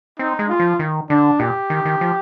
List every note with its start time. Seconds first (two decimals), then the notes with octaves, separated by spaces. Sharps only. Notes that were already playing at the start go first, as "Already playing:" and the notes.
0.19 C4 D#4
0.39 G#3
0.49 F4
0.59 F3
0.79 D#3
1.10 D3 D4
1.40 A#2 G4
1.70 D#3
1.85 D#3
2.01 F3